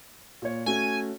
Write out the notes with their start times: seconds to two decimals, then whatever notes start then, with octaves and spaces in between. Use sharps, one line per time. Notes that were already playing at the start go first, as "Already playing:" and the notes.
0.42 A#2 C#5
0.66 A3 C#4 F#4 G#5